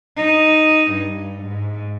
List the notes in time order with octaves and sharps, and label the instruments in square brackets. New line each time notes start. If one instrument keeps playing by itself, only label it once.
[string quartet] D#4
G2
G#2